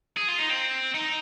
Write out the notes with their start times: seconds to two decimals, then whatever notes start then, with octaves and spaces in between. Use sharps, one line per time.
0.17 G#4
0.29 F4
0.39 D#4
0.50 C4
0.95 D#4